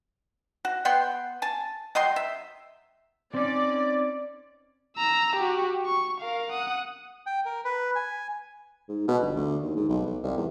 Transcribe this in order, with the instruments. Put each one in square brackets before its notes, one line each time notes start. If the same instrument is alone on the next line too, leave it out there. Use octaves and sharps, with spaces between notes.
[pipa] F#4
B3 F#5 G5 C6
G#5 A5
F#3 D#5 G5 C6
E5
[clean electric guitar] C4 C#4 D#4 [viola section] D5
[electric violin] A#5 E6
F#4 G4
C#6
A#4 F5
F#5 D#6
[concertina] G5
A#4
B4
G#5
[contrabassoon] G#2
B2
G1
D2
D#2
G#2
B1
B1
C2
E2